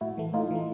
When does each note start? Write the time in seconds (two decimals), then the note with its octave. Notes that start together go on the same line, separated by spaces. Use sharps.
0.01 A2 E4 F#4
0.18 E3 A3
0.33 A2 D#4 F4
0.51 E3 A3